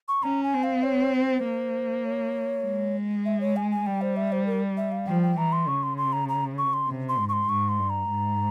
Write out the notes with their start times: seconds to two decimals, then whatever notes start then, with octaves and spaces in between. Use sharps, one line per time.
0.08 C#6
0.23 C#4 A#5
0.43 G#5
0.54 C4
0.63 F5
0.83 C#5
1.14 C5
1.44 A#3
2.05 C#5
2.65 G#3
3.26 E5
3.41 C#5
3.56 G#5
3.71 G#5
3.86 G3 G5
4.02 C5
4.16 E5
4.32 C5
4.47 A#4
4.77 E5
4.92 F5
5.07 F3 G5
5.23 G5
5.37 E3 A#5
5.52 C6
5.68 C#3 C#6
5.83 C6
5.98 C6
6.13 A#5
6.29 A#5
6.58 C#6
6.73 C6
6.88 C3
7.09 C6
7.19 G#2
7.29 C#6
7.33 C6
7.49 G#2 C#6
7.69 C6
7.79 G2
7.90 A#5
8.10 G#2